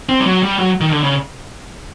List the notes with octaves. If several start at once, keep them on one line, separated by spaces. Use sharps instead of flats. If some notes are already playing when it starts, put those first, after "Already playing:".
C4
G3
F#3
G3
F#3
D#3
D3
C#3